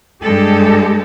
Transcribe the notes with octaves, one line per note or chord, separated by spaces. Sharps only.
G2 G#3 G4 A4